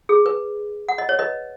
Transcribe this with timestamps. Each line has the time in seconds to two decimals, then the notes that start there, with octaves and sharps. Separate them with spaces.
0.09 G#4
0.26 B4
0.89 F#5
0.98 D#5
1.09 C#5
1.19 B4 D#5